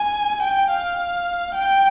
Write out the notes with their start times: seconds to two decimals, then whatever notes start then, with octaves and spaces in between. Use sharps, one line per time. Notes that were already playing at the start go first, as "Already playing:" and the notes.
Already playing: G#5
0.42 G5
0.70 F5
1.54 G5